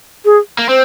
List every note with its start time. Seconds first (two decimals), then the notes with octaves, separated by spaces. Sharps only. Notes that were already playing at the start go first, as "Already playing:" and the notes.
0.25 G#4
0.59 A#3
0.69 C4 C5